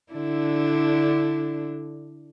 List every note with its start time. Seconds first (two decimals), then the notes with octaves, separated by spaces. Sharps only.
0.12 D3 D4 E4